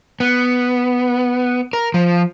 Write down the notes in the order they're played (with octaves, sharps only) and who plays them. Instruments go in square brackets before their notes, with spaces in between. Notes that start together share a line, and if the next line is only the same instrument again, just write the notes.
[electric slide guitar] B3
A#4
F3